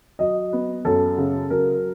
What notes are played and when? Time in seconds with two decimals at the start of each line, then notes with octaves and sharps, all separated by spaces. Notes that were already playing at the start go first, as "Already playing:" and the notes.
0.19 F#3 D#5
0.53 B3
0.85 F#2 A4
1.18 C#3
1.50 F#3 A#4